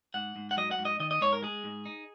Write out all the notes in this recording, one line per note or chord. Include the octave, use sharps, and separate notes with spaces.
G#2 F#5
G#2
F#5
F#3 D#5
F#5
G#2
D#5
D#3 D#5
D#5
G#2 C#5
A#4
G#3 G#4
G#2
D#4